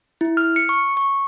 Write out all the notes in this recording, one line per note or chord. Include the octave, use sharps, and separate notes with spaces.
E4
F6
C#7
C#6
C#6